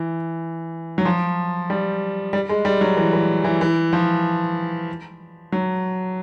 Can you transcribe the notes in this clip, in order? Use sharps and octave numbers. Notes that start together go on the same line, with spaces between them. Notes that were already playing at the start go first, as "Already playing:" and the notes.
Already playing: E3
F#3
F3
G3
G3
G#3
G3
F#3
E3
E3
E3
E3
F3
F#3